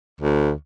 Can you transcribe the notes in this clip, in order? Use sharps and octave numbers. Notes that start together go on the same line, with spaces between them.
D2